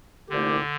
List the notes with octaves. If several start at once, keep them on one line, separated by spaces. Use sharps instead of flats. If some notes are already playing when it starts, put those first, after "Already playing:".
C2 A#2 D3 A3 D#4 G4